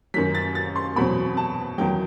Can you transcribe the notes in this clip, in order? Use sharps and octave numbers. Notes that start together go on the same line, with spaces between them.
F#2 D#3 F#3 B6
A6
A6
C6
E2 B2 F#3 C4 B5
A5
E2 D#3 F#3 G5